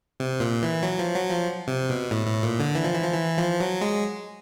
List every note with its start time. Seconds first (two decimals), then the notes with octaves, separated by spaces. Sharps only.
0.20 C3
0.40 A#2
0.63 E3
0.83 F#3
0.99 F3
1.15 F#3
1.31 F3
1.68 C3
1.89 B2
2.11 A2
2.27 A2
2.43 A#2
2.59 D3
2.75 E3
2.84 F3
2.94 E3
3.03 F3
3.14 E3
3.38 F3
3.60 F#3
3.81 G#3